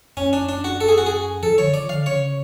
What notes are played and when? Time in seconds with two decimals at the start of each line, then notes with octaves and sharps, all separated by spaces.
0.17 F#2 C#4
0.33 D4
0.49 D4
0.64 F#4
0.81 A4
0.88 G#4
0.98 F#4
1.06 G#4
1.43 F3 A4
1.58 D3 C#5
1.74 F3 D5
1.89 D3 F5
2.06 C#3 C#5